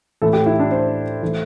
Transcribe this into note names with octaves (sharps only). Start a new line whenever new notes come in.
A2 E3 A3 A4
G4
E4
D4
C5
E3 A3